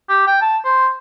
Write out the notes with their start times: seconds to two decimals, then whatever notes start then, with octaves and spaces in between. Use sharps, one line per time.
0.09 G4
0.27 G5
0.41 A5
0.65 C5